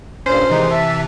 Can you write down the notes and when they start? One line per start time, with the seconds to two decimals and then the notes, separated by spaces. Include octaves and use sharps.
0.26 G2 A#2 C#4 C5
0.49 C3 D#3 E3 G#3 D#4
0.71 E5 A5 E6